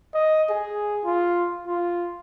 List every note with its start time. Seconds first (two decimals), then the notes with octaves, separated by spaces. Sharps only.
0.14 D#5
0.50 G#4
1.05 F4
1.67 F4